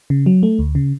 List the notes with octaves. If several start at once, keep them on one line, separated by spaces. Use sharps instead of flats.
C#3
F#3
A3
D2
C#3